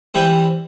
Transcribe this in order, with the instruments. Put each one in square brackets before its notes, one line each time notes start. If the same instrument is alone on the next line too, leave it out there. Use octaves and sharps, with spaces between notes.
[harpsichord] E3 G3 C4 G5